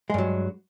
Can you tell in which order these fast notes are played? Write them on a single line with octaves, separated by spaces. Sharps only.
G#3 G2 F#3